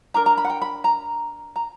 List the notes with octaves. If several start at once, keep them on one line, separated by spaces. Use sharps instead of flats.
D4 A#4 A#5
A#5
B5
F#5
G5
B5
A#5
A#5